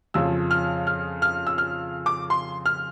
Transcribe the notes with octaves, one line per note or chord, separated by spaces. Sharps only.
F2 C#3 F3 E6
F6
F6
F6
E6
F6
D6
C6
F6